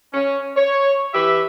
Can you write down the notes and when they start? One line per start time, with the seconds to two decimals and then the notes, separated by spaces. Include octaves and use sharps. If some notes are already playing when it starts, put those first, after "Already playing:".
0.13 C#4
0.56 C#5
1.14 E3 G4 B4 E5